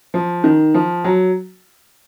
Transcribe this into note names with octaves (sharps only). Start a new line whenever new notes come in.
F3
D#3
F3
F#3